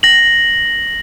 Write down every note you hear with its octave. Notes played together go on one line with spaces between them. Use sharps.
A#6 F#7